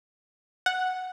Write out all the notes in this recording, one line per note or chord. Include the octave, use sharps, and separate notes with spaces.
F#5